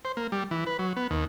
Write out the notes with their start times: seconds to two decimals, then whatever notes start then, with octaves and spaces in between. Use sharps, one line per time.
0.05 C5
0.17 A#3
0.32 G3
0.51 E3
0.67 B4
0.79 F#3
0.96 B3
1.10 D#2